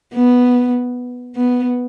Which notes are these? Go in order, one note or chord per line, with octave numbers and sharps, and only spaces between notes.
B3
B3